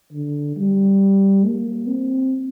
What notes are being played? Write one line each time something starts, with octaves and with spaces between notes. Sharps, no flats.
D3
G3
A#3
C4